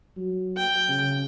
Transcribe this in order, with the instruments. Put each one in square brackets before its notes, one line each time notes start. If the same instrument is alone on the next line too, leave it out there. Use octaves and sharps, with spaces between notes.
[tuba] F#3
[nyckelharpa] G5
[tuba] C#3